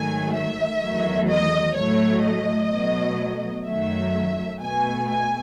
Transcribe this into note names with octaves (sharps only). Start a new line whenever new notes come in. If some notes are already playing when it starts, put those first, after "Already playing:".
Already playing: G#2 D#3 F#3 A3 G#5
E5
E2 D#3 F#3 A3
D#5
A2 F#3 A3 C#5
D#5
B2 F#3 A3
F#2 D#3 F#3 A3 E5
B2 A3 G#5
G#5